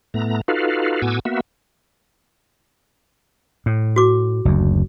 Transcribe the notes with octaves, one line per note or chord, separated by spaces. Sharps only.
A2 A3 B3 A#5
D#4 F4 F#4 A4 B4 F5
A2 B3 F#4 G#5 D6 E6
A#3 B3 F#4 E5
A2
F#4 D6
F#1 D2